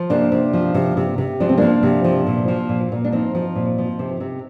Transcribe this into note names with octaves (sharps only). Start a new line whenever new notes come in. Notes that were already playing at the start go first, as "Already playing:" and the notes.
Already playing: F3
C3 A#3 D4
C3
F3
C3
C3
C3
F3 D4
C4
F3 A#3 D4
C3
F3
A#2
F3
A#2
A#2
D4
F3 C4 D#4
F3
A#2
F3
C3
C3